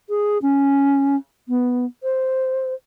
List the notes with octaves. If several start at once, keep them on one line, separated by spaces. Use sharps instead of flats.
G#4
C#4
B3
C5